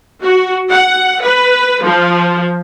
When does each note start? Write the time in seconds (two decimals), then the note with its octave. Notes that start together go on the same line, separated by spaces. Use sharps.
0.24 F#4
0.70 F#5
1.22 B4
1.84 F3